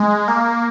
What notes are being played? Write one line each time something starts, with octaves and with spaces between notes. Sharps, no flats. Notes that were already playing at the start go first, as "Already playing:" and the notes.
Already playing: G#3
A#3